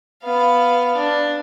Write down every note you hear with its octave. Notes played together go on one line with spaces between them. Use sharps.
B3 F5
D4